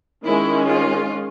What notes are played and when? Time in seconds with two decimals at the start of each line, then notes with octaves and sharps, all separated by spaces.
0.24 D#3 G#3 C#4 E4
0.68 F4